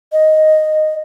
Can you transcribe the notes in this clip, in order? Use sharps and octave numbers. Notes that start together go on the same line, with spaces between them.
D#5